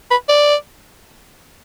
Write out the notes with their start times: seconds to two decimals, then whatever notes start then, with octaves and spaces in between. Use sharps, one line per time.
0.11 B4
0.29 D5